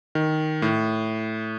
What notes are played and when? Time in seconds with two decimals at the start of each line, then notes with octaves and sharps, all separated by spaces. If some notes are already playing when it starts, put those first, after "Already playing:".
0.15 D#3
0.62 A2